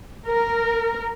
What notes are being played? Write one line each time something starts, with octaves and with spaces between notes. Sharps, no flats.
A#4